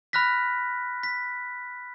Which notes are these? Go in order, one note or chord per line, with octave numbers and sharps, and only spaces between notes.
B5 F6 F#6 A#6 B6
B6